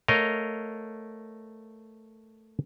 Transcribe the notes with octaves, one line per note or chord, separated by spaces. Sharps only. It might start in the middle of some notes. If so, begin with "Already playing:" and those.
A3 A#4 C#5 D#5 F5